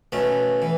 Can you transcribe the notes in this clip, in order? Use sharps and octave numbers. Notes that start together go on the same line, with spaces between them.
B2 A3 C#4
E3